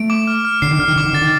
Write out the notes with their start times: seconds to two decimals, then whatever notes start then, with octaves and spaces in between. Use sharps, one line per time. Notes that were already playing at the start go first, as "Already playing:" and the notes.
Already playing: A3 D7
0.10 D6
0.27 F6
0.45 F6
0.62 D3 C7
0.71 D#3
0.79 D3 F6
0.88 D#3
0.96 D3 D6
1.05 D#3
1.13 D3 A6
1.21 D#3